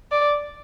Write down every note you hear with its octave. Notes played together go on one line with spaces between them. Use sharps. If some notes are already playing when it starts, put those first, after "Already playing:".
D5